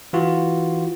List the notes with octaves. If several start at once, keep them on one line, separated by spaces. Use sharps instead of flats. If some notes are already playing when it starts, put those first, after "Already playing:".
E3 F4 F#4